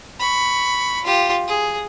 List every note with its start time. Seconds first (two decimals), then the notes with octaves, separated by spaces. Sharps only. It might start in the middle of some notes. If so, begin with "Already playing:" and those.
0.20 B5 C#6
1.04 F4 G4
1.48 G#4